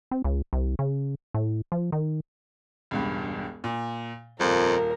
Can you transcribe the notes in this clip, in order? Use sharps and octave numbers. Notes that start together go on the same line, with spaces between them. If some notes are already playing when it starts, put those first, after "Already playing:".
C4
C#2
C2
C#3
A2
F3
D#3
E1 C#2 G2
A#2
D#1 F2 F4 A#4